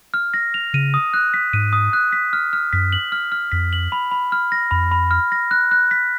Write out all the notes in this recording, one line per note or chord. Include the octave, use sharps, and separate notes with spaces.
F6
A#6
F7
C#3 D#7
D#6
F#6
B6
G#2 D#7
D#6
F#6
B6
F6
F6
F#2 B6
F#7
F6
F6
F2 B6
F#7
B5
B5
F6
A#6
F2 B5
B5
F6
A#6
F#6
F#6
B6